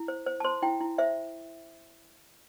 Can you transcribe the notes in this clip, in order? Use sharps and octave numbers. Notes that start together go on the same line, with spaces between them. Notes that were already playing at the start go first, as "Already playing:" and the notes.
Already playing: E4
C5
C5
A5
C5 C6
E4 G5
E4
C5 E5